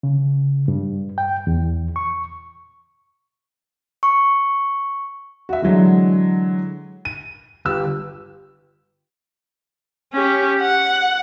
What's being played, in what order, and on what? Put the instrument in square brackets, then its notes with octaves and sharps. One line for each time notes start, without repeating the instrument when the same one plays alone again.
[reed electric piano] C#3
G2
G5
E2
C#6
[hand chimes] C#6
[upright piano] F#4 E5
D3 E3 F#3 G#3
D#7
G1 G4 E6
[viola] C#4 G4
F#5